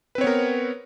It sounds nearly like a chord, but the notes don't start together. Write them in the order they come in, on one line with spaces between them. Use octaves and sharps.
B4 C4 C#5 B3 A#4